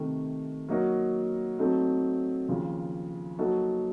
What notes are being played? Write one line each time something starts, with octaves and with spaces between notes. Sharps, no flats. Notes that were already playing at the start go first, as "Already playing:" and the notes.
Already playing: C3 D#3 A3
F#3 A#3 D#4 F#4 A#4
F#3 A3 C4 D#4 A4
D#2 C#3 F3
F#3 A#3 D#4 F#4 A4